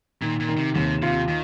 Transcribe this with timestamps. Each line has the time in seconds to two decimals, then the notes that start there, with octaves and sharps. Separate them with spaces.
0.22 A#2 D#3
0.40 A#2
0.49 D#3
0.57 C3
0.75 D#2 C3
1.02 C3 F4
1.29 D#3